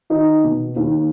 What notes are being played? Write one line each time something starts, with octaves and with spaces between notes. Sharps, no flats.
D#3 D#4
B2 B3
D#2 D#3